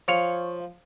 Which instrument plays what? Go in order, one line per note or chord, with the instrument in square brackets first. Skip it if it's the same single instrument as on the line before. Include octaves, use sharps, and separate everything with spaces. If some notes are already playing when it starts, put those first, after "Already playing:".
[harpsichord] F3 [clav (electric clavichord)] C#5 F5